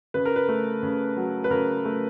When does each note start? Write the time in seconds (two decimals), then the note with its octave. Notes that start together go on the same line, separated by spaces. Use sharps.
0.14 C#3 B4
0.25 A#4
0.36 B4
0.49 A3
0.83 C#3
1.17 F#3
1.44 B4
1.51 C#3 A#4
1.85 A3